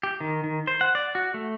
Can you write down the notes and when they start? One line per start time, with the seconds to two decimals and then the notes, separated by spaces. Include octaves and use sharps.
0.03 G4
0.21 D#3
0.44 D#3
0.67 C5
0.81 F#5
0.95 D5
1.15 F#4
1.34 A3